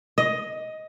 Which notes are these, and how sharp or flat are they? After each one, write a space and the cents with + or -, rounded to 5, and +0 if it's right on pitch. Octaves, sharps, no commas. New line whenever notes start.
D#5 +10